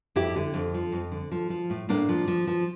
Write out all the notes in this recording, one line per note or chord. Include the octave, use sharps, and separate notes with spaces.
F2 E4 G4
D3
F2
F3
F2
D3
F3
F3
A2
A2 A#3 D4
F3
F3
F3